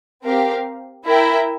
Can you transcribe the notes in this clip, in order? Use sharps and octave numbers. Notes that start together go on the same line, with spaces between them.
C4 G4 A#4 F5
E4 A#4 E5 G5